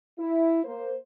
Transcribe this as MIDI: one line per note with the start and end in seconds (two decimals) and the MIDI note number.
0.18 0.62 64
0.64 0.93 58
0.64 0.93 72